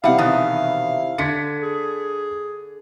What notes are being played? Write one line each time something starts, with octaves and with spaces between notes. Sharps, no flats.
C3 G3 E4 F5 F#5
B2 D#3 E3
D3 G#6 B6 C#7
G#4